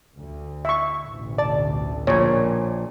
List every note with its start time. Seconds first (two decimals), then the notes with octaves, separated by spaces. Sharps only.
0.18 D2
0.65 E5 C#6
1.00 A1 D2 B2
1.38 D5 A5
2.07 A#1 A#2 C#5